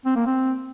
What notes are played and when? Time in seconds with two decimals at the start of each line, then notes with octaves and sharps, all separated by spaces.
0.06 C4
0.16 A#3
0.27 C4